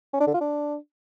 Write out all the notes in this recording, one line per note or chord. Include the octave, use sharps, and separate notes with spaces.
C#4
D4
D3
F4
D4